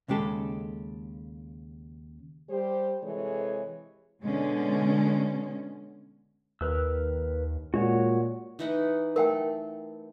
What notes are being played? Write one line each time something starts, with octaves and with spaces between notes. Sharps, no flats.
D#2 C#3 G#3 G4 A4
G3 G4 C5
C3 E3 G#3 G#4 A4 C#5
B2 D3 G#3 C#4
D#2 A#4 B4 E6
A#2 G#3 F#4 C#5 F#5
E3 D#4 F#5
A3 A#4 F#5 G5